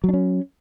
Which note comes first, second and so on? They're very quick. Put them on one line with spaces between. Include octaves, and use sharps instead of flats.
F#3 D4 C#4